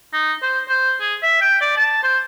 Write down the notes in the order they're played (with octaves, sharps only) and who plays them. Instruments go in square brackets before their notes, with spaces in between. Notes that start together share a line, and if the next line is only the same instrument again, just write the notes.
[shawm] D#4
C5
C5
G#4
E5
G5
D5
A5
C5